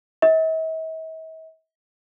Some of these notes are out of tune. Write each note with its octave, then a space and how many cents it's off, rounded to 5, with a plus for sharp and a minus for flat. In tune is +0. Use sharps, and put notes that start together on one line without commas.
E5 -45